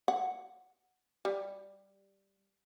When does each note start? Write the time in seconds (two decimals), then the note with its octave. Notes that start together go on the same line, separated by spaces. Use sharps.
0.08 F#5
1.25 G3